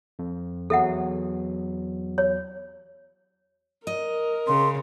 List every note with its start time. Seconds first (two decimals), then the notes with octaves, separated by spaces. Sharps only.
0.19 F2
0.70 E2 F#3 A4 E5 F#5
2.18 C#5
3.87 A#4 D#5
4.47 C#3 C6